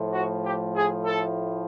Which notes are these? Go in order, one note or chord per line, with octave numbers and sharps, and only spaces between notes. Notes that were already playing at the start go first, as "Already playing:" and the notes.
Already playing: A2 F3
F#4
G4
G#4
A4